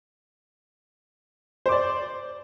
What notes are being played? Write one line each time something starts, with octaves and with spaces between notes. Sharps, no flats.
C5 D5 D6